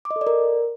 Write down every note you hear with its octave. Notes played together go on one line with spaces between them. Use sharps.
D6
D#5
A4
D5
A#4